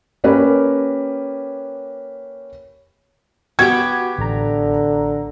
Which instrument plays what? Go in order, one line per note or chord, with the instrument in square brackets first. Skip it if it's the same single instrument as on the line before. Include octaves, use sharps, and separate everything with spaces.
[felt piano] A#3 C#4 G4 A#4 B4
[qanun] B3 G4 [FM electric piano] F#4 [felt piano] G#6
[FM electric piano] A1 A#5 [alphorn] D3